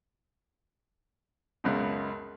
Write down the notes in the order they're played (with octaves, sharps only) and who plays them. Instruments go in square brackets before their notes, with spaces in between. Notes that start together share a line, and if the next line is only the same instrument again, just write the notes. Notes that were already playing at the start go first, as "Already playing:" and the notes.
[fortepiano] C#2 F#2 B2